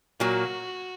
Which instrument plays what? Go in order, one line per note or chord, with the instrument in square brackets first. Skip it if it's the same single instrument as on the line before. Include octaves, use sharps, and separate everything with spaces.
[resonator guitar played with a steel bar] A#2 F#3 A#3 [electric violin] F#4